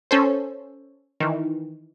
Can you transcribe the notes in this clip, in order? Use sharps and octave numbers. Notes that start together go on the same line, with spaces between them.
C#4 A4 C5
D#3 E3